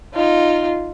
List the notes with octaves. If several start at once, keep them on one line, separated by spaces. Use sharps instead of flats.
D#4 F4